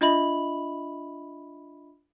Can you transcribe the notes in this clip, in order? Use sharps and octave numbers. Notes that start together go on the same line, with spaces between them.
D4 F4 D#5 E5 B5 F#7